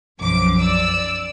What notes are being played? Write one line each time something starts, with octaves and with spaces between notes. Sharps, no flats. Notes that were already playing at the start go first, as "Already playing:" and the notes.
B1 F#2 F3 D6
D5 E6